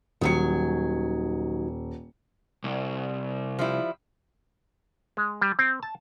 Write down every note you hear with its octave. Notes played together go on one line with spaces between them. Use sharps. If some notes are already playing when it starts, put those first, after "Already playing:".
D#1 D#3 F#3 G#5 C#7
C2
F3 G3 E4
G#3
G3
C4
A5